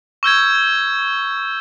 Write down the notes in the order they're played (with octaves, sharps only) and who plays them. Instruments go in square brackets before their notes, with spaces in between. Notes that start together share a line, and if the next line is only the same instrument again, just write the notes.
[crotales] C#6 E6 G6 G#6